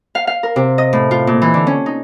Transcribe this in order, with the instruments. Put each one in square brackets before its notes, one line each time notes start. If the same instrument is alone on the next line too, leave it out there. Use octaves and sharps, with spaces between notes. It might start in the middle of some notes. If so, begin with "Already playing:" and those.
[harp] F5
F5
A#4
C3
D#5
A2
F4
A#2
E3
D3
C#4
D#4